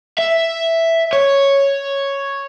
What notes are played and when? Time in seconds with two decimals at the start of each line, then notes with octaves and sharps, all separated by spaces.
0.18 E5
1.13 C#5